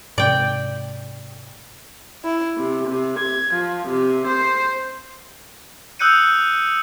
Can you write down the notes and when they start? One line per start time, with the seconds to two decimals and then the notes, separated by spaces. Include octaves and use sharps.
0.18 G#2 C3 D5 G5
2.24 E4
2.56 C3
2.87 C3
3.20 G#6
3.55 F3
3.87 C3
4.27 C5
5.99 D#6 E6 F#6 G6 C#7 D#7